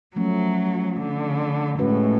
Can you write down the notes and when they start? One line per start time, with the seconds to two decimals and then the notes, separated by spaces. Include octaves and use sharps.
0.16 F3 F#3 A3 C#4
0.97 D3
1.79 A2 G#3 C#4 F#4 B4